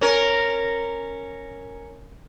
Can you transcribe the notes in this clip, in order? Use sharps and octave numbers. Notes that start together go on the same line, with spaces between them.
C#4 A#4